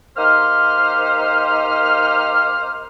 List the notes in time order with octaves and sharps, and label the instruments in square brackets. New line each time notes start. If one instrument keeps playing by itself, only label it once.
[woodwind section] A#3 D#4 G4 C5 F6